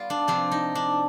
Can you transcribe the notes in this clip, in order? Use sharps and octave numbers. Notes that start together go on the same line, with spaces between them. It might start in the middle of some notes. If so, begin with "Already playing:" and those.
Already playing: G3 B3 F4
D4
C3 F3 C4 D4
D#4
D4